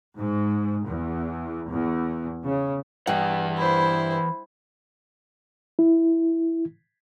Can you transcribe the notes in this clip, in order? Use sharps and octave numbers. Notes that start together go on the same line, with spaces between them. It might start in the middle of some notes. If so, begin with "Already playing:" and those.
G#2
E2
E2
C#3
G2 E3 F#5
E4 C5 B5
E4